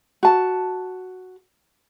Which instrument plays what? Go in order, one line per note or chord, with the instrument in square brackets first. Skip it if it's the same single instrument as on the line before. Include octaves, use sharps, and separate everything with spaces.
[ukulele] F#4 A5